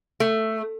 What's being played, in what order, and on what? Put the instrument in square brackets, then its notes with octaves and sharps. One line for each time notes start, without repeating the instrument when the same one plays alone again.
[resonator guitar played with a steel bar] A3